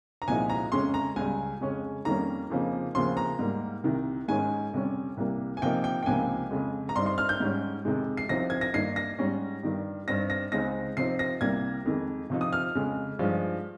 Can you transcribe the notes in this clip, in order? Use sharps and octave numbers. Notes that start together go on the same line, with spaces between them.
A#5
C2 A#2 F3 G#3 D#4 G#5
A#5
F2 C#3 G#3 C#4 C6
A#5
C#2 C#3 G3 G#5
F2 C#3 G#3 C#4
F2 D#3 G3 A#3 C#4 A#5
F2 C#3 F3 A#3 D#4
D#2 C#3 F3 C4 C6
A#5
G#2 G3 A#3
C2 C3 D#3
G#2 D#3 G#3 C#4 G#5
F2 C3 G3 C#4
C2 C3 G3 A#3
G#5
C3 F3 A#3 D#4 G5
G5
G5
C#2 C3 F3 A#3 D#4 G#5
F2 C#3 G#3
A#5
G2 G3 C4 D#4 C6
C6
F6
G6
G#2 G3 C#4
F2 C3 D#3 G#3
C7
C2 C3 F3 C4 D#4 A#6
G#6
A#6
G2 D#3 A#3 D#4 C7
A#6
G#2 G3 C#4
G2 D#3 G3
G2 G3 C4 D#4 A#6
A#6
C#2 C#3 G#3 C4 D#4 A#6
C3 F3 C4 D#4 C7
A#6
C2 C3 G3 A#3 G#6
F2 D#3 G#3
C3 F3 C4 D#4
D#6
F6
F2 C#3 G#3
G2 F3 G#3 D#4